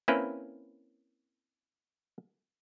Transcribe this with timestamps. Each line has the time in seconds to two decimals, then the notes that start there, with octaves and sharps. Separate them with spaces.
0.08 A#3 C4 C#4 E4 B4